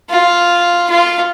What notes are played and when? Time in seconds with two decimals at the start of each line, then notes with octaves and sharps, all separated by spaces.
0.10 F4
0.90 F4